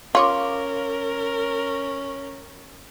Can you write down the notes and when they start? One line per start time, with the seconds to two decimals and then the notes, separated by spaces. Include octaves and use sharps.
0.15 C#4 F4 A#4 C#5 C6 D6